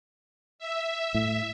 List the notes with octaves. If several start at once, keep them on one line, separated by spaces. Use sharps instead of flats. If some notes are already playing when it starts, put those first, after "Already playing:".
E5
A2